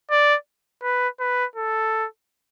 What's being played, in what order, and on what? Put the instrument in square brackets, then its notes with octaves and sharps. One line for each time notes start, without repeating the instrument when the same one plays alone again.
[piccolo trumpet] D5
B4
B4
A4